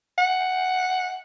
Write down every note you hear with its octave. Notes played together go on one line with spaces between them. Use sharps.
F#5